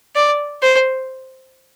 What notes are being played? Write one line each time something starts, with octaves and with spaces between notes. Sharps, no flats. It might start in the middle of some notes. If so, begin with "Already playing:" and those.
D5
C5